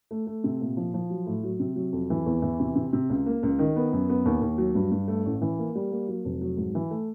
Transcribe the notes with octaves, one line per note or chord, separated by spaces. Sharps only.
A3
A3
C3
A#2
F3
F3
F#3
A2
F#3
C3
F#3
F2
E3
E2
E3
C3
C3
C3
C#2
A#3
C#2
D#3
B3
F#2
B3
D#2
D#2
F#3
G2
G2
A3
A1
E3
A#3
G3
A#3
F#3
F1
F#3
G#2
E3
A3